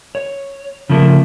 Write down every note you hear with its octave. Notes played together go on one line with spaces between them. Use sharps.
C#5
C#3 F3 A3 A#3